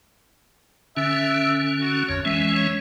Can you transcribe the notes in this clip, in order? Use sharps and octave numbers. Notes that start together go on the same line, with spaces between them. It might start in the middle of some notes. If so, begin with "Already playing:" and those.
D3 C#4 E5
F#4
A1 F2 C#5
E3 G#3 C#4 E5
C#5